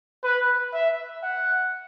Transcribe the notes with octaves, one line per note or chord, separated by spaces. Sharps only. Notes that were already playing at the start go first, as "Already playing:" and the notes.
B4
E5
F#5